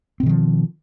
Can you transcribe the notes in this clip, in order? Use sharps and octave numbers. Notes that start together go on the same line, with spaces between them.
B2 D#3 F3 C4